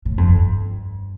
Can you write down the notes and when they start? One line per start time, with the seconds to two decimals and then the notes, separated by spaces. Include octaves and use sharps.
0.05 A2
0.18 F2
0.29 G2